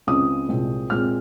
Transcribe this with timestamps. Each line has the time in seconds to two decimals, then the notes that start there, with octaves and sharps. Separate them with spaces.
0.07 C#2 C#3 G#3 C4 D#6
0.48 C2 A#2 G#3 C4
0.90 A#2 G#3 C4 F6